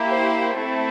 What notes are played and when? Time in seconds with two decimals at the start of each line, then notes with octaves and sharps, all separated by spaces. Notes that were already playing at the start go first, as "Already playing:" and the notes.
Already playing: A#3 E4 G4
0.11 C5
0.57 A3 C4 E4